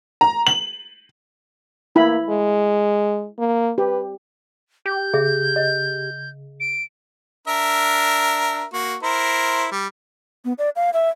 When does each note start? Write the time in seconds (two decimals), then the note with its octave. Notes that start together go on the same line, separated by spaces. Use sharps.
0.21 A#5
0.47 F#7
1.96 A#3 E4 B5
2.29 G#3
3.39 A#3
3.78 G4 B4
4.86 G4 G6
5.14 C#3 G#4 E5
5.56 D#5
6.60 D7
7.48 D4 A#4 E5
8.73 A#3 F#4
9.03 E4 A#4 C5
9.72 G3
10.45 B3
10.58 D5
10.76 F5
10.93 E5